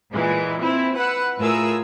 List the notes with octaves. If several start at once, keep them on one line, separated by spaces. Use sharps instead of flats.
A#2 E3 G#3
C4 E4
B4 F#5 E6
A2 F4 G#4 A#4 E6